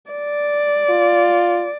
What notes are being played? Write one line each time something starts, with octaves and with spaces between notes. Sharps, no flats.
D5
F4